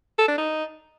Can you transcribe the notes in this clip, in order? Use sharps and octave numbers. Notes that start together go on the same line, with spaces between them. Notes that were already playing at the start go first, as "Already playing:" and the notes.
A4
D4
D#4